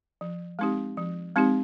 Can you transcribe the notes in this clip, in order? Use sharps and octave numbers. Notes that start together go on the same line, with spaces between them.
F3
G#3 C4 D#4 G4
F3
G#3 C4 D#4 G4